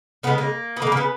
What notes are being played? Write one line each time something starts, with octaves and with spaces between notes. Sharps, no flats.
C#3 E3 G#3 B3
A#3
B3
G#3 A#3
C#3
A#3
B3